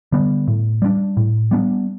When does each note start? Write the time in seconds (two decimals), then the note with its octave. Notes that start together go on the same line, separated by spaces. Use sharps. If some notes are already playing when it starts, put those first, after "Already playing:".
0.12 D3 G3 B3
0.48 A2
0.82 G3 B3 D4
1.17 A2
1.51 G3 B3 D4